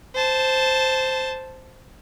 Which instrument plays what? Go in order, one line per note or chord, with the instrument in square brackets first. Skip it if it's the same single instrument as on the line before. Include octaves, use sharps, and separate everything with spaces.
[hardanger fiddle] C5 A5